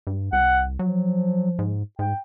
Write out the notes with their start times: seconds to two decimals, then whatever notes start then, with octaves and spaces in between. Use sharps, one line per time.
0.07 G2
0.32 C2 F#5
0.79 F3 F#3
1.59 G#2
1.99 G#2 G5